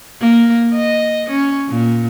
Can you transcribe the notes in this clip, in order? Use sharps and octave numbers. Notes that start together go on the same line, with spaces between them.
A#3
D#5
C#4
A#2